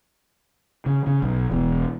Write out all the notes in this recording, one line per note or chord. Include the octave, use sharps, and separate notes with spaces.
C#3
C#3
B1
E1 E2